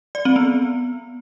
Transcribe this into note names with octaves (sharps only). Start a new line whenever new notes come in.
D5
C4
B3